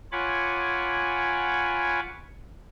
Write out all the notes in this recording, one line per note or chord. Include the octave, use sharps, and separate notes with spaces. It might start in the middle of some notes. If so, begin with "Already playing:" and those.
F4 C#5 F#5 G#5 B5 D6